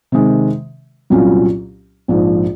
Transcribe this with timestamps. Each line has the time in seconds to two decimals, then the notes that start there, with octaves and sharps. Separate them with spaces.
0.12 C3 D#3 G#3
1.10 C2 A#2 F#3 C#4 F4
2.08 A#1 G#2 F3